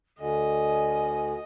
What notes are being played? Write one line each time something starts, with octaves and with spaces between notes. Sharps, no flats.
D2 D3 D#5 G#5